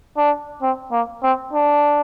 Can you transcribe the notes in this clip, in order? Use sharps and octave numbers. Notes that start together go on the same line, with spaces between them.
D4
C4
A#3
C4
D4